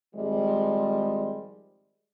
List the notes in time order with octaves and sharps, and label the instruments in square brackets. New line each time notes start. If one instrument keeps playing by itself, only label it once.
[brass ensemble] G#1 F3 G3 G#3